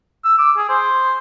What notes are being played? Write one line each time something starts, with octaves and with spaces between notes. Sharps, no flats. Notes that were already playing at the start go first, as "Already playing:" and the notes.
E6
D6
G#4
C5